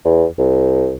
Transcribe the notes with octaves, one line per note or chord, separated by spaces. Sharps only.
E2
C2